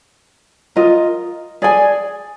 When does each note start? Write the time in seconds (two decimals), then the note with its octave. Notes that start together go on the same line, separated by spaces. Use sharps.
0.76 F4 A#4 D#5
1.62 G#4 D5 G#5